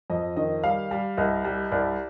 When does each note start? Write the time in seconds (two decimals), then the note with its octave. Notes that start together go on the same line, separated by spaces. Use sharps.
0.10 F2 D#5
0.37 D#3 D#5
0.64 G3 F5
0.91 G3
1.17 C2 D#5
1.45 G3
1.71 C2 D5